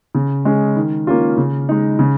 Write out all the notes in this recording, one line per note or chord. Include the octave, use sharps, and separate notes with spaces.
C#3
G#3 C#4 G#4
D#3
A#3 C#4 F4
C#3
G#3 D#4
C#3